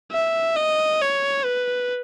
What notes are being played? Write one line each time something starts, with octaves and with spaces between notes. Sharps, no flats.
E5
D#5
C#5
B4